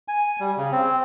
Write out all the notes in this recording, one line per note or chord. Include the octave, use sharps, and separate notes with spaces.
G#5
G3
C#3
C4